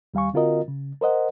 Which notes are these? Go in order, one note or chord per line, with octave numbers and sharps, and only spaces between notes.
D#2 G3 F5 G#5 C#6
D3 C4 F4 F#4 A#4 D#5
C#3
A#4 C5 D#5 F#5